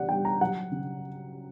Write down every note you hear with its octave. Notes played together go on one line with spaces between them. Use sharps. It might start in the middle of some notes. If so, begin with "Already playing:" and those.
Already playing: C#3 E3 D5 F#5
G3 G5
A#5
F#3 F#5
C#3